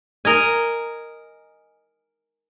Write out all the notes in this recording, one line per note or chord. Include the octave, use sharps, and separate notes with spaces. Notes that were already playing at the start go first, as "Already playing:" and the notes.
A#4 D#5 G#5